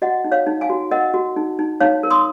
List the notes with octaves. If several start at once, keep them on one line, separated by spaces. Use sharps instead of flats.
F#4 D#5 F#5
D#4
C#5 F5
D#4
F5 G#5
F#4
A#4 D#5 F#5
F#4
D#4
D#4
D#4 C#5 F5
A#4
C6 D#6